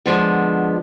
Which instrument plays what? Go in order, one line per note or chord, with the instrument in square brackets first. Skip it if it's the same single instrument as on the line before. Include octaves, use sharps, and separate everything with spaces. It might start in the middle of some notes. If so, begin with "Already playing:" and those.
[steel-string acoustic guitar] D3 F3 G#3 B3